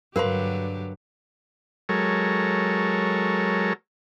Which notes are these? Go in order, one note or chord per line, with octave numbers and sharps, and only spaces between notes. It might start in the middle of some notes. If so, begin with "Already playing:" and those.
G2 D3 F#3 G4 A#4 B4 F5 C6
F#3 G#3 A4 A#4 C#5